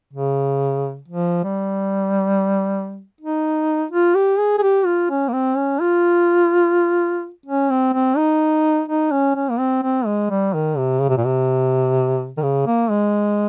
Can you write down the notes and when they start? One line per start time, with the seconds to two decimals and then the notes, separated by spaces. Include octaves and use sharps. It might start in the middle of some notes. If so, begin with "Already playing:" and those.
0.13 C#3
1.08 F3
1.44 G3
3.21 D#4
3.91 F4
4.15 G4
4.39 G#4
4.58 G#4
4.62 G4
4.86 F4
5.10 C#4
5.28 A#3
5.33 C4
5.57 C#4
5.80 F4
7.46 C#4
7.70 C4
7.93 C4
8.17 D#4
8.88 D#4
9.11 C#4
9.35 C#4
9.50 A#3
9.59 C4
9.83 C4
10.06 G#3
10.30 G3
10.54 D#3
10.77 C3
11.01 C#3
11.09 C3
11.17 A#2
11.25 C3
12.37 D#3
12.42 C#3
12.66 A#3
12.90 G#3